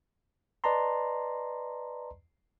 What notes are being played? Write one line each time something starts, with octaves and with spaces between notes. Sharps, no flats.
B4 D5 D#5 A5 A#5 C6